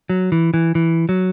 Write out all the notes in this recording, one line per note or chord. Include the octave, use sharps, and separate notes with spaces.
F#3
E3
E3
E3
F#3